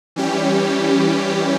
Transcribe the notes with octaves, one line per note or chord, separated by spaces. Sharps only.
E3 G3 C#4 G4